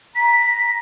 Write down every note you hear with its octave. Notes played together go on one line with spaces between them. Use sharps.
A#5 B6